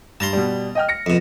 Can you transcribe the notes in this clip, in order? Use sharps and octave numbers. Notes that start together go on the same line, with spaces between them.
G2 A5 A#5 C6
B2 G3
D#5 G5 F6
A#6 C#7
F2 B2